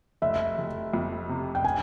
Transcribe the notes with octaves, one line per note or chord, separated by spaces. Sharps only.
F1 E5
F1
F2
C3
G5
G#5